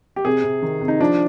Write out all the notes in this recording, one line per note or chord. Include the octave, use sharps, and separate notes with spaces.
G4
C3 G#4
C3
D#3
C3
D#4
F3 D4